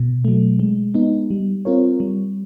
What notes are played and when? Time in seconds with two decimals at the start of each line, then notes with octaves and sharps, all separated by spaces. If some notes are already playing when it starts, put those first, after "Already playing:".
Already playing: B2
0.25 F#3 A3
0.59 G#3
0.94 B3 D#4
1.30 G3
1.65 C4 F4 A#4 C#5
2.00 G3